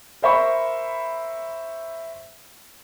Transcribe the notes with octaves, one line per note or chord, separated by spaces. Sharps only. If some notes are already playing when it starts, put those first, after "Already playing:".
A#4 C5 E5 B5 C#6